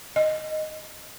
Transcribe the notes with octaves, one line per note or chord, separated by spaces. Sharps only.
D#5